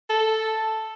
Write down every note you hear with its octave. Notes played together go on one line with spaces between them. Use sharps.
A4